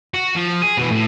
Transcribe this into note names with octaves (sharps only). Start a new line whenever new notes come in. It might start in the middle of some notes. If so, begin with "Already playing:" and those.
F#4
F3
G#4
B2 E3
A2